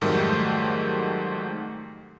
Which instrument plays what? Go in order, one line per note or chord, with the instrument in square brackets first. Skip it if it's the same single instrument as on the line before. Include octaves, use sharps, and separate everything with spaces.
[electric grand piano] F2 G#2 D#3 F#3 G3 A3